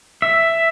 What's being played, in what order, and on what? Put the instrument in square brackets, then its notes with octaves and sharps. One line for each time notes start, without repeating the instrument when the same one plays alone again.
[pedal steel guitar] E5